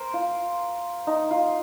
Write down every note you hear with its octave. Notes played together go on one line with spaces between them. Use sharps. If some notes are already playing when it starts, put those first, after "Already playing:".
Already playing: A#4 C5
F4
D#4
F4